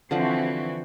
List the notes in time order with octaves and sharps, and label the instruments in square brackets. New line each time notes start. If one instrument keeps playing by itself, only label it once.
[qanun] D3 F3 F#5 [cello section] E3 C4 F#4